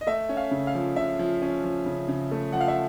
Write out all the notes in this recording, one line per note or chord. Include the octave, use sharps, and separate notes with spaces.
D#5
A3 E5
C#4
F5
C#3
F5
F3
C#3 E5
F3
C#4
F3
C#3
C#3
A3
F3 F#5
F5
E5